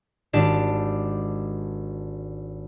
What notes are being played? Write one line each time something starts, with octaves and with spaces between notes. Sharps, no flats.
G#1 D4 G4 A5